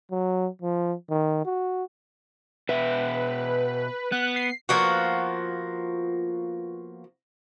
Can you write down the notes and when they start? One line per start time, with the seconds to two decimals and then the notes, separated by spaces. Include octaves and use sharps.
0.11 F#3
0.62 F3
1.10 D#3
1.45 F#4
2.69 B2 B4 E5
4.12 B3 F#6
4.36 C7
4.69 F3 A#3 B3 F#4